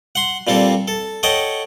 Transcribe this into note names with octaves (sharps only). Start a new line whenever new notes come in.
F#5 C6
A#2 G3 C4 A4
A4
A4 C#5 D#5 F#5 G5